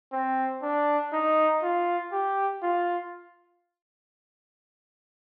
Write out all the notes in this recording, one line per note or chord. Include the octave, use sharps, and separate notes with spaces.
C4
D4
D#4
F4
G4
F4